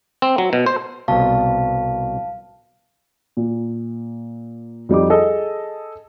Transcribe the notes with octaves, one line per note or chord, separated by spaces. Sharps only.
C4
F#3
B2
C5
C2 B2 F5 A5
A#2
F2 G3 D#4 D6
G#4 A4 D#5